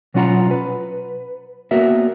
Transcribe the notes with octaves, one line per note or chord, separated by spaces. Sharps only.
B2 F#3 C#4 F4 F#5 A#5
B4
A#3 B3 F#4 A#4 E5